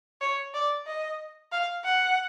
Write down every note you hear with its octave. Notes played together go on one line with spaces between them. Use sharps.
C#5
D5
D#5
F5
F#5